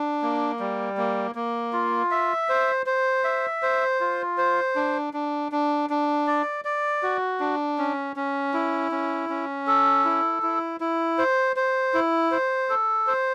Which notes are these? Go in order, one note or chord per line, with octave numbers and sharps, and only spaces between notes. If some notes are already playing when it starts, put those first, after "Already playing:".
Already playing: D4
A#3
G3
A#3
A#3
F4
E5
C5
C5
E5
C5
F4
C5
D4
D4
D4
D4
D5
D5
F#4
D4
C#4
C#4
E4
C#4
C#4
A4
E4
E4
E4
C5
C5
E4
C5
A4
C5